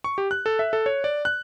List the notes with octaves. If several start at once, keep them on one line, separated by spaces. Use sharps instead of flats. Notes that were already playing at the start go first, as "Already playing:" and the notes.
C#6
G4
F#6
A4
E5
A4
C#5
D5
F#6